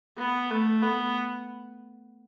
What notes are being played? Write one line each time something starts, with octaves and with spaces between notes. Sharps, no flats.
B3
A3
B3